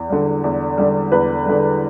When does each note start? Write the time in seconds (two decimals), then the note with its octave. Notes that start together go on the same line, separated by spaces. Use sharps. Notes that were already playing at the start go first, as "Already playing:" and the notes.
Already playing: E2
0.10 D3 G3
0.44 E2
0.78 D3 G3
1.12 E2 B4
1.46 D3 G3